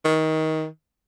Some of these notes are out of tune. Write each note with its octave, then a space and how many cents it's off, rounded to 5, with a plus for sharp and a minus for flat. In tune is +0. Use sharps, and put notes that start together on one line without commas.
D#3 +20